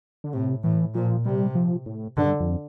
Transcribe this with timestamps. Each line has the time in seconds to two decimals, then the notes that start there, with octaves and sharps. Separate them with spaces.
0.24 D3
0.33 A2 C3
0.64 A2 E3
0.94 A#2 F3
1.25 C3 G3
1.55 F3
1.86 A2
2.17 G2 D3
2.40 F2